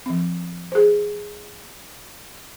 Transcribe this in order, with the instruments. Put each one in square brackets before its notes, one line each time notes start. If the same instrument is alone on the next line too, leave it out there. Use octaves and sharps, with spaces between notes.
[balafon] F3 C4
G#4 C5